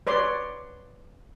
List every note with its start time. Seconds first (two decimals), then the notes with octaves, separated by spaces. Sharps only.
0.07 B4 C#5 D5 C6